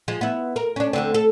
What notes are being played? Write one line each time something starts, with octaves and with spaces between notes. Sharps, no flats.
F3 G#3
B3 E4
A#4
C#4 D4
D2 D3 C4
A4